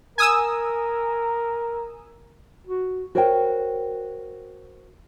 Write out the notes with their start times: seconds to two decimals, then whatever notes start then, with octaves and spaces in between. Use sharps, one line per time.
0.18 A#4 G#5 D#6 E6
2.67 F#4
3.15 F#4 A#4 C5 C#5 F#5 G5